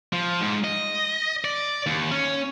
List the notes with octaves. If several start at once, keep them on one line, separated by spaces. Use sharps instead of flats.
F3
G#2
D#5
D5
D#2
C#4